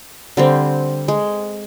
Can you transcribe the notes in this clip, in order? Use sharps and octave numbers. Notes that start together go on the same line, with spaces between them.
D3 G3 C4
G#3